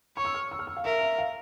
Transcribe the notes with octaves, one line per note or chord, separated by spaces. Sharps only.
C#5 C#6
E6
F6
E6
F6
E6
F5
A#4 E5
E5
F5